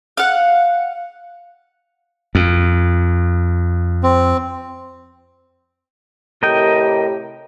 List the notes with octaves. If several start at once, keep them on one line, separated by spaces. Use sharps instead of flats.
F5 F#5
F2
C4
A2 C3 G4 A#4 D#5 G5